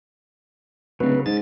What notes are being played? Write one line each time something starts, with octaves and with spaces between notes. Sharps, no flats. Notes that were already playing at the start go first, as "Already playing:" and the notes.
D1 C#3 F#3 B4
G#2 G#3 C#4 A6